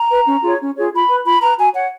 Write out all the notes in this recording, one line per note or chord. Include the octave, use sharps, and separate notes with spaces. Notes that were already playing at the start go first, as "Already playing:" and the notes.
Already playing: A#5
B4
C#4
F4 G#4 C#5
C#4
F4 G#4 C#5
F4 B5
B4
F4 B5
B4 A#5
F#4 G#5
C#5 F#5